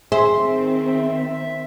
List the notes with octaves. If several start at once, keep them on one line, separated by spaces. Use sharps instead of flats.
D#3 C4 G#4 C5 E5